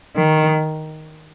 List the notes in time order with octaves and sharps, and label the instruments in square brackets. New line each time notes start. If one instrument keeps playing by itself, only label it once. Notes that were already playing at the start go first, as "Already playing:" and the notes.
[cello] D#3